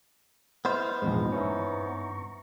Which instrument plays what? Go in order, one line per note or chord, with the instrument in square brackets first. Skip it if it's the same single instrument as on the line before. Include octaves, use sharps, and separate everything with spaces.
[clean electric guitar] B3 C5 [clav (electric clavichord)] E4 [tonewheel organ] D#5 C6 F6
[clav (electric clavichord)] A#1 E2 G#2 [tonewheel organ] D#4 B4 D#5
[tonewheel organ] G2 A#5 C#6 [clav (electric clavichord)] C#4 D#4 E4